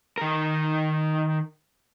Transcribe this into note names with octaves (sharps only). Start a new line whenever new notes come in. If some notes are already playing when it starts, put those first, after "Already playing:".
D#3 A#4